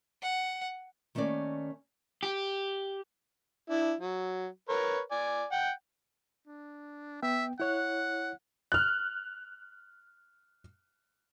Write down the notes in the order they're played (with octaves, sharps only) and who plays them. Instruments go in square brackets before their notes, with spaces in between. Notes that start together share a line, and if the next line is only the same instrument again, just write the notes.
[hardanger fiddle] F#5
[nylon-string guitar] D#3 A3 A#3 C#4 D5
[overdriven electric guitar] G4
[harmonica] D4 E4
F#3
A#4 B4 C#5
D5 G#5
F#5 G5
[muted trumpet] D4
[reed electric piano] B3 G5 [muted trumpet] E5
[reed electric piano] E4 C#5 F#6 [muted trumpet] F#5
[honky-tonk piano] F6 F#6